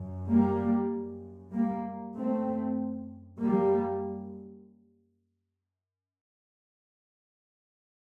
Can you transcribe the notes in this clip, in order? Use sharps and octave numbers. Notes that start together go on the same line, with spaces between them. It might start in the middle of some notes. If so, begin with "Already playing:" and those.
Already playing: F#2
G3 A#3
F#2
G3 A#3
F#2 A3 C4
F#2 G3 A#3